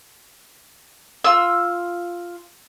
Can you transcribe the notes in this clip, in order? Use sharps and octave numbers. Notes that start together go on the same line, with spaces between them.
F4 E6